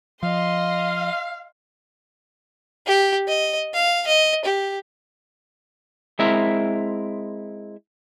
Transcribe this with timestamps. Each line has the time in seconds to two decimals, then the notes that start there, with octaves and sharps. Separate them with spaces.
0.23 F3 D#5 F5 C6
2.86 G4
3.28 D#5
3.74 F5
4.07 D#5
4.45 G4
6.19 G#3 C4 E4 A#4 E5